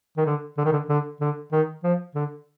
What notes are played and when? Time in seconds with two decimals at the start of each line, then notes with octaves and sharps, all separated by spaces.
0.17 D#3
0.26 D3
0.57 D3
0.65 D#3
0.73 D3
0.89 D3
1.21 D3
1.52 D#3
1.84 F3
2.15 D3